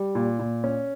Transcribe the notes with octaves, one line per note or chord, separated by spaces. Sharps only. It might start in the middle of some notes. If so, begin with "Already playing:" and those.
Already playing: G3
A#2
A#2
C#4